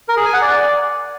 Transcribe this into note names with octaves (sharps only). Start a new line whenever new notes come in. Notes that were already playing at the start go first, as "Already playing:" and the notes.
A#4
G#4
G#5
F#5
D5